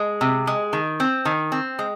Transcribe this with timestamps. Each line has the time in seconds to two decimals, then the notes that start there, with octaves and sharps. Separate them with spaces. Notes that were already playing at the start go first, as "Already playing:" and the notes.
Already playing: G#3
0.21 C3
0.47 G#3
0.73 D#3
1.00 C4
1.25 D#3
1.52 C4
1.79 G#3